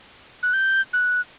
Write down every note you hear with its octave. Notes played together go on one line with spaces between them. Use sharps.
F#6
G6
F#6